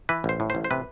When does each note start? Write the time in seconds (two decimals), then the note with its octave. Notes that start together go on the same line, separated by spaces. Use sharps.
0.09 E3 B4
0.24 A1 C5
0.40 A2
0.50 A1 C5
0.64 C5
0.71 C3 B4